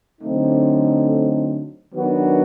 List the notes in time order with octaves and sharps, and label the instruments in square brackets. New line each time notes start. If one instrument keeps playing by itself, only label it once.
[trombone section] D3 F#3 A3 C4 D#4
D#3 F#3 B3 D4 F#4